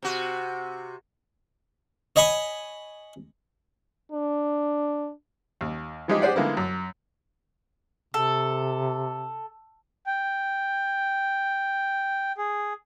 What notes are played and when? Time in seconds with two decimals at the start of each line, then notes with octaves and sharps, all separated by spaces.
0.03 C3 F#4
2.16 C#5 D#5 G#5 B5 C#6 D#6
4.12 D4
5.61 D#2
6.08 E3 F3 G#3 D#4 G4 D#5
6.22 G4 G#4 C5 D5 F#5
6.35 D3 G#3 A#3 B3 E4 F4
6.57 F#2
8.14 C3 A4
10.07 G5
12.38 G#4